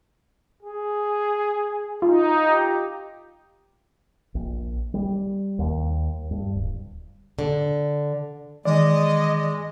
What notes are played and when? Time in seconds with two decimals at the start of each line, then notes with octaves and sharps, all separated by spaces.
0.63 G#4
2.02 D#4 F4
2.45 G4
4.35 A#1
4.94 G3
5.59 D#2
6.31 G2
6.54 D1
7.39 D3
8.65 D#3 E3 G#3 D5 D#5